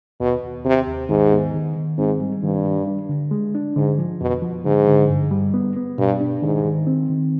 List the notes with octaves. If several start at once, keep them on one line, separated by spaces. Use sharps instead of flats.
D#2 B2
D#2
D#2 C3
D#2
G#2 D#3
B3
D#3
D#3
G#2 C4
G3
G2 D#3
G3
D4
D3
G#3
D4
G#2 D3
F3
F2 B2
F3
G#2 D3
D3
G2
G3
B3
B3
G2 B2
D4
G#2 D#3
D#3
C4
D#3